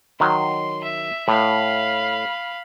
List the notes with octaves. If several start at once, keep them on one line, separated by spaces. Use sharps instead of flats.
D#3 F#3 C6
E5
A2 F5 B5